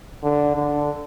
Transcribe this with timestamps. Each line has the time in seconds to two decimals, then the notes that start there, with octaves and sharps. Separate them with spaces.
0.23 D3
0.56 D3